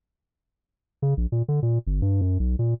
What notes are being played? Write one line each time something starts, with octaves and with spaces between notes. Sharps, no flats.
C#3
A#1
A#2
D3
A#2
G1
G2
F#2
B1
A#2